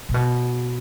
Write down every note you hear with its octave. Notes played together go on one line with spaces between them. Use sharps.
A#2
B2